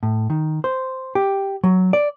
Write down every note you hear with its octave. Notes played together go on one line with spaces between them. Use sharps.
A2
D#3
C5
G4
F#3
D5